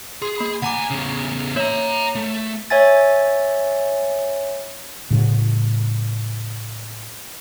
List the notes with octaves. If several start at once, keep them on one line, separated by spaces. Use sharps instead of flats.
G#4 C6
A#3 B5
D2 F#5 G#5 A#5 D6
E2 C#3
A#3 C#5 E5 A#5
A3
C#5 E5 G#5 A6
A2 C#3 E3 F#3